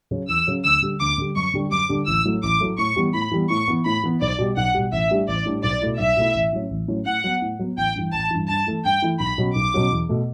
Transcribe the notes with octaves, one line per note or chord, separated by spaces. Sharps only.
C#3 F#3 C#4
E2 E6
C#3 F#3 C#4
D2 E6
D3 G3
D2 D6
D3 G3
F#2 C#6
D3 G3 D4 G4
F#2 D6
D3 G3 D4 G4
A1 E6
A2 F#3 A3
A1 D6
A2 F#3 A3
A2 C#6
E3 G3 B3
A2 B5
E3 G3 B3
A2 C#6
E3 B3
A2 B5
E3 B3
B1 D5
B2 G3
B1 F#5
B2 G3
A1 E5
A2 G3 D4 G4
A1 D5
A2 G3 D4 G4
B1 D5
B2 A3 E4
B1 E5
B2 A3 E4
A1
A2 F#3 C#4
A1
A2 F#3 C#4
A2 F#5
F#3 B3
A2
F#3 B3
A1 G5
G2 E3
A1 A5
G2 E3
G2 A5
E3 A3 E4
G2 G5
E3 A3 E4
B1 B5
B2 F#3 C#4 F#4
B1 D6
B2 F#3 C#4 F#4
E2
B2 A3